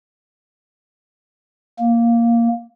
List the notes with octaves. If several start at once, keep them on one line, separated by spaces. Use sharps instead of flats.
A#3